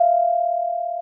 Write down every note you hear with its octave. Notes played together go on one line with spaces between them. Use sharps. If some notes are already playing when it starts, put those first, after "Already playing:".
Already playing: E5 F5